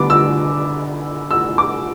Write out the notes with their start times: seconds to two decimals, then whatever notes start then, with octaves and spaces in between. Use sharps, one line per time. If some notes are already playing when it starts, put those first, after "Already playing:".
Already playing: D3 G3 B3 D4 D6
0.10 E6
1.31 E6
1.58 D6